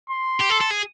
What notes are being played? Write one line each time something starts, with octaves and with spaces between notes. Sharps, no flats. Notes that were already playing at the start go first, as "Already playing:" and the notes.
C6
G4
A4
A4
G#4